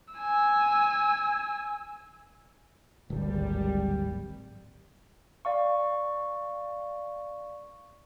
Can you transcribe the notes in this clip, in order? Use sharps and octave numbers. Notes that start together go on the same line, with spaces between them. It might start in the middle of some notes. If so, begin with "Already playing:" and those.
G#5 E6
D1 G#1 G3
D5 F5 C#6